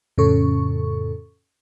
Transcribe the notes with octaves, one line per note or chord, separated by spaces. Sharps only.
F2 A2 C#3 C#4 A4 C#6